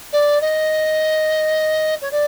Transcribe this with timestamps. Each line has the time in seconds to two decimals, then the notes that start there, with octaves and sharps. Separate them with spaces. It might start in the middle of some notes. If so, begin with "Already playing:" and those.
0.12 D5
0.41 D#5
2.01 C#5
2.11 D5